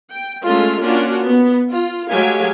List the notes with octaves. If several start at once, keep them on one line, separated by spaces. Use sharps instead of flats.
G5
G#3 A3 C#4 F4 A4
A#3 C#4 D4 F4 F#4
B3
F4
F#3 G#3 A3 G4 F5 G#5